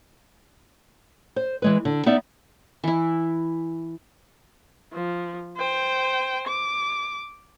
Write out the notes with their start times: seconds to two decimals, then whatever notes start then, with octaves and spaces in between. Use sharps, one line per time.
1.36 C5
1.62 E3 G#3 B4
1.85 D3
2.06 B3 D#4 D5 E5
2.84 E3 E4
4.94 F3
5.57 C5 G5
6.47 D6